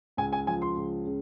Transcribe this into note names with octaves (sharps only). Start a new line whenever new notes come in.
C#2 G#5
G#5
F3 G#5
C6
C#2
C#3